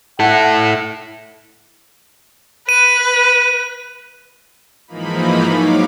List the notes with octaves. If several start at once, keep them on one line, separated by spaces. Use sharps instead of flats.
E4 A4 F#5
B4 D#7
G#2 E3 F3 A#3 D#4 B5
F#3 C#5 F5 D6